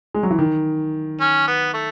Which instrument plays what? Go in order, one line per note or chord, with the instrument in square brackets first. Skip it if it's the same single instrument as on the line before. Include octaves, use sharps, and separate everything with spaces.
[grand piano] G#3
F#3
E3
D#3
[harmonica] C#4
B3
A3